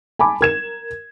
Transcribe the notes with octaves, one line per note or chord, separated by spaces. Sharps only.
G#5 A5 B5 D6
A#4 G#6 E7